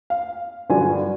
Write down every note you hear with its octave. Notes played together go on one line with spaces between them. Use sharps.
F5
G2 D3 F#3 G#5